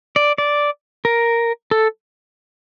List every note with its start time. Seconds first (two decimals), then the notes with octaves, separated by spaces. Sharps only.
0.16 D5
0.38 D5
1.05 A#4
1.71 A4